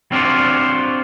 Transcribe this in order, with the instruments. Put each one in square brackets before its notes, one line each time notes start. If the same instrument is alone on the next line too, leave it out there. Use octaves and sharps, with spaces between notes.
[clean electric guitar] C4 D4 F4 F#4 C5 D5